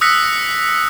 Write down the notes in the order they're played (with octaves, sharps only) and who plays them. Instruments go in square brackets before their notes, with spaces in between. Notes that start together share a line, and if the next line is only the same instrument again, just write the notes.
[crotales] D#6 E6 F#6 A#6 B6 C#7